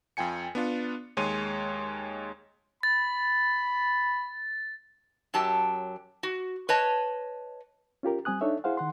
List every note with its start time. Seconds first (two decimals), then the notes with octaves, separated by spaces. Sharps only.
0.17 F2 F4 G5 G#5 C#7
0.55 B3 D4 F4
1.17 D#2 G#3 C#5 C6 D#7
2.83 B5 A6
5.34 F#2 F#3 G4 A5
6.23 F#4
6.69 B4 C#5 D#5 A5
8.03 C#4 F4 G4 A#4
8.25 G3 C4 G#5 D#6 F#6
8.41 D4 D#4 A4 C#5 E5
8.64 E4 G#4 C5 F5 F#5
8.77 D#3 F#5 C6